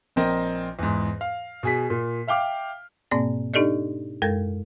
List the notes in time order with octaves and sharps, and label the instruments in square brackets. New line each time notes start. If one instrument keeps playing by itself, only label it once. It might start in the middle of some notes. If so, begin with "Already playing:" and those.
[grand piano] A#1 C4 A#4 D#5 A#6
E2 G#2
F5
B2 G#4 B6
A#2
E5 F5 G5 D6 F6
[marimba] G#2 B2 A#3 C4 D5
D4 D#4 G4 A4 D5 D#5
F#2 G#3 A4 A#4 G#6 A#6